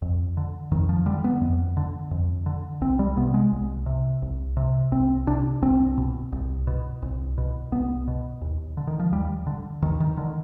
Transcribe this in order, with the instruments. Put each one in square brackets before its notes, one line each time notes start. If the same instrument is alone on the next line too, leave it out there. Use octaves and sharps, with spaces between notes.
[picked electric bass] F2
D3
F2 D#3
F3
D3 G3
B3
F2
D3
F2
D3
C2 C4
G3
C3 B3
G#3
C2
C3
C2
C3
C2 C4
C3 D4
C2 C4
B2
C2
B2
C2
B2
C2 B3
B2
D#2
D3
D#3
F3
D#2 G3
D3
D#2 D#3
D#3
D3 D#3